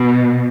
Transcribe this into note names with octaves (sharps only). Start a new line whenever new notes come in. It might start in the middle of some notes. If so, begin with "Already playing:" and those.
Already playing: B2